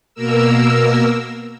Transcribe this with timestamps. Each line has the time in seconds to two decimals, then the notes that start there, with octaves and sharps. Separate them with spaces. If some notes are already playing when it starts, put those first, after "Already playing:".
0.15 B2 A#3 A#4 E6